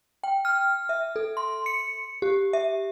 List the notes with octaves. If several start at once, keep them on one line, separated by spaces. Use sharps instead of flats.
G5
F6
E5
A4
C6
C#7
G4
E5